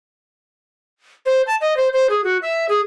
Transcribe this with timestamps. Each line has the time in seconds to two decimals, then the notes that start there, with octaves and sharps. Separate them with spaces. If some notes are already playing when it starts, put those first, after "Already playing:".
1.26 C5
1.47 A5
1.61 D#5
1.77 C5
1.93 C5
2.10 G#4
2.24 F#4
2.42 E5
2.69 G#4